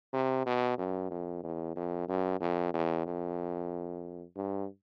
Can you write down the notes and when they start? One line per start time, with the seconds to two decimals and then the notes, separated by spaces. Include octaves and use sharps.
0.13 C3
0.46 B2
0.78 F#2
1.10 F2
1.43 E2
1.76 F2
2.09 F#2
2.41 F2
2.74 E2
3.06 F2
4.36 G2